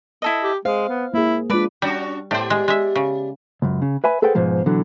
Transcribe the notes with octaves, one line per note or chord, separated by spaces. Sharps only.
E4 A4 D#5
G4
G#3 C5 F5
B3
A#3 E4 G#4
G#3 D4 F4 B4 D5 B5
G3 C#4 D4 F#4
A2 B3 G4 C5 D5
G#3
G#3 E5
C#3
C#2 F#2
C#3
B4 E5 G#5 B5
G#4 A4 B4 C5 F#5 G5
G#2 B2 F3 G#3
B2 D3 E3 F#3